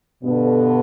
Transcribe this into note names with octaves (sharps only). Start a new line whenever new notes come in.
G2 B2 D3 B3